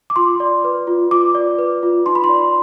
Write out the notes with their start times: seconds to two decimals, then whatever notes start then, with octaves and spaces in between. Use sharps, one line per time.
0.10 D6
0.16 F4 C6
0.40 D5
0.64 B4
0.87 F4
1.11 F4 D6
1.35 D5
1.59 B4
1.83 F4
2.06 D#4 C6
2.15 B5
2.24 C6
2.29 D5